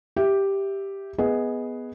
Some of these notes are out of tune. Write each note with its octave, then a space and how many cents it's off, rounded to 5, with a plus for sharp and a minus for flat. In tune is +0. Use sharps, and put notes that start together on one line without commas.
G4 +0 E5 +0
B3 +0 G#4 +0 D#5 +15